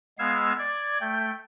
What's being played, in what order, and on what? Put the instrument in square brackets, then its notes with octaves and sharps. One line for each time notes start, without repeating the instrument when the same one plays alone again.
[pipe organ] G#3 B3 F5 E6 G#6
D5 G#6
A3 G5